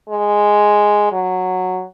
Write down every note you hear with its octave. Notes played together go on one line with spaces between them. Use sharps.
G#3
F#3